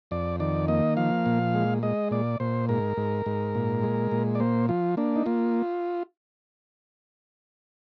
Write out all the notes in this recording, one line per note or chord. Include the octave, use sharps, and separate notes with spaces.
F2 D5
D#3 D5
A#3 D#5
F3 F5
A#2
G#3
G#3 D#5
A#2 D5
A#2 C5
G#2 A#4
G#2
G#2
A#2
G#3
A#2
D5
A#3 C5
F3 F4
A#3 D4
D#4
A#3 F4